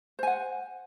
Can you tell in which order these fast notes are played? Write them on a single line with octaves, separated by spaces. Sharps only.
C5 G#5 F#5